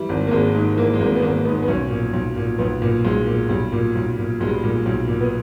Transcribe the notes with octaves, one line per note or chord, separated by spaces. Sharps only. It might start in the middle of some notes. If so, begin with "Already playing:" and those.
Already playing: E3 G3
G#1
A#3
G#1 G#3
G#2
E3 A#3
G#3
G#1 A#3
B3
G#1 A#3
G#2 B3
B3
B1 C#4
A#2
B1
A#2
B1 B3
A#2
B1 G#3
A#2
B1 G3
A#2
B1
A#2
B1 G#3
G3
G#3
A#2
B1
A#2
B3